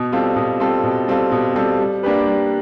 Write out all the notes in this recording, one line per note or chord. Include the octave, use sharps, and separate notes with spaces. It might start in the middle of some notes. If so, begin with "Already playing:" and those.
Already playing: B2
G3 C4 F4 A4
B2
G3 C4 F4 A4
B2
G3 C4 F4 A4
B2
G3 C4 F4 A4
G3
A#3 D4 G4 B4
G3